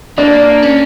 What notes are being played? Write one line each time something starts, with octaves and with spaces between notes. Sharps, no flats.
A#3 D4
C#4